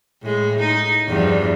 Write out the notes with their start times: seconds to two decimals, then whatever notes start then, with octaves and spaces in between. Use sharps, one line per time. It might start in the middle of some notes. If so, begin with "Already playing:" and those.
0.22 A2 G#3
0.59 D#4
1.08 E2 G2 F3